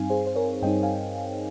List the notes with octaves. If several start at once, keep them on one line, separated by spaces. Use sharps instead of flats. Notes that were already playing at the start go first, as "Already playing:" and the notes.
Already playing: G2 G3 C4 D#4 F5 G#5
G#4 C5
C5
A#4 C#5
G2 G3 C4 D#4 D#5 G5
F5 G#5